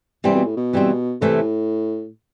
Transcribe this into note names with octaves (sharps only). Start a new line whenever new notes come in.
C3 E3 G3 C4
B2
A2
B2
E3 G3 C4
A2 C3 E3 A3